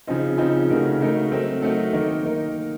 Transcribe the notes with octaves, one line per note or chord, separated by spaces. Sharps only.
C#3 F3 C4 D#4
C#3 F3 C4 D#4
C#3 A3 D#4 F#4 A#4
C#3 A3 D#4 F#4 A#4
F#3 A3 C4 D#4 A#4
F#3 A3 C4 D#4 A#4
D#3 A#3 D#4 A#4
D#3 A#3 D#4 A#4